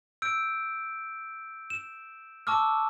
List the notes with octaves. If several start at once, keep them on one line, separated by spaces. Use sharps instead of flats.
E6 G6 D7
E7
A5 C#6 D6 E6 F6